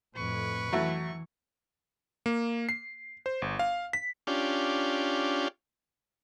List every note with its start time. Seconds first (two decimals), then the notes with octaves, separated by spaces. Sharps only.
0.16 F2 A2 B4 C#6
0.72 E3 F#3 A3 E4
2.26 A#3
2.69 C7
3.26 C5
3.42 G1
3.59 F5
3.93 B6
4.27 C#4 D4 F4 G4